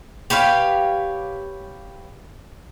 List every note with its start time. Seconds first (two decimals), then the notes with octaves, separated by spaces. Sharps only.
0.30 G4 B4 C#5 F5